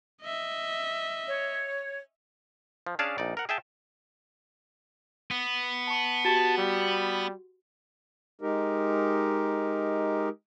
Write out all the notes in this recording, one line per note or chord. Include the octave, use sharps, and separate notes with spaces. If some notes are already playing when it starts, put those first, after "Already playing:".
D#5 E5
C#5
F3
C#4 D4 G#4 D5 F5 A5
A#1 D#4 D5
A#4 F#5
G#4 E5 G5 A5
B3
A5 C#6
F#4 G4 A5
G3
G#3 D#4 G4 A#4